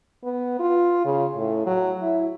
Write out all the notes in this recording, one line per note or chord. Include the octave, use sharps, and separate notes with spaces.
B3
F4
C#3
A2
F#3
E4